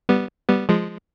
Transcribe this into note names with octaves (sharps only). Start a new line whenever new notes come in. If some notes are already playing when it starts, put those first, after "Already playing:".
G3 B3
G3 B3
F3 G#3